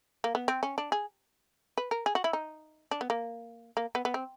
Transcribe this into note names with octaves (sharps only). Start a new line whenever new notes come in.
A#3
B3
C4
C#4
D4
G#4
B4
A#4
G#4
F#4
E4
D#4
D4
B3
A#3
A#3
B3
B3
C4